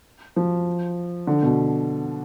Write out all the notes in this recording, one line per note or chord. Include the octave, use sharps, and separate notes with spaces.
F3
D3
B2